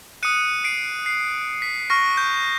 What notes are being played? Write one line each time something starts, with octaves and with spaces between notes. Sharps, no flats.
D#6 F#6 C#7 D#7
C7 D7
C7
B6
C#6 F6 A#6
G6